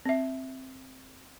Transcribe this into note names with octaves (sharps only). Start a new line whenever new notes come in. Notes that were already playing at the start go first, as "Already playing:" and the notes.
C4 E5